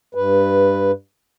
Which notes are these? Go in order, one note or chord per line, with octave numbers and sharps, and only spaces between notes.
G2 B4